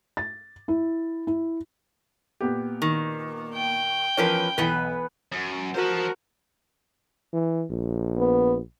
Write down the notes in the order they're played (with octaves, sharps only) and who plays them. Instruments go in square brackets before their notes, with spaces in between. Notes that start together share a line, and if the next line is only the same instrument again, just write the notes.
[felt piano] A6
E4
E4
A#2 B3 G4
[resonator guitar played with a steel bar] D#3
[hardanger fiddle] G5
[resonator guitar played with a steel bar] E2 F3 B4 [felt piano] C#4 A#4 C#5
[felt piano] B1 [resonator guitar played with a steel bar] E3 B3 B4
[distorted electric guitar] F#2
[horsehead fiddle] F#4 A#4 [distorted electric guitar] C5 A5
[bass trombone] E3
A#1
[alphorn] B3